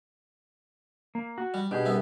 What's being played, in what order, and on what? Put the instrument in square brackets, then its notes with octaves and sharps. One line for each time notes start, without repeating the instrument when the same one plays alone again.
[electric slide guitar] A#3
F#4
[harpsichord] G3
[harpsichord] B2 [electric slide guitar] D4 G4 G#4
[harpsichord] C2 B3 E5